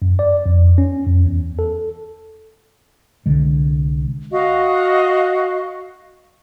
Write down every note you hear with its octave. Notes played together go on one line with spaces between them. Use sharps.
F#2
D5
F2
C#4
F2
E2
A4
C2 D3 G#3
F#4 D#5 F5